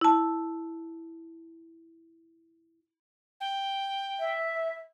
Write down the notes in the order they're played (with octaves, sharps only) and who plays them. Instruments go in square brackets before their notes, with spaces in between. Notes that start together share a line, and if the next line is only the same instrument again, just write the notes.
[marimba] E4 A5
[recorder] G5
[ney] E5